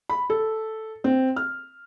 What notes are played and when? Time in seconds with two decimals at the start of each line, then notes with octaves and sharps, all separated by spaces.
0.09 B5
0.30 A4
1.04 C4
1.36 F6